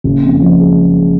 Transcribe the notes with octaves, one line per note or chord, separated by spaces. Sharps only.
F#1
F2
F3
G#3